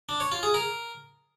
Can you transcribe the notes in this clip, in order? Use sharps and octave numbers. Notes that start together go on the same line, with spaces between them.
D4
C#5
F4
G#4
A#4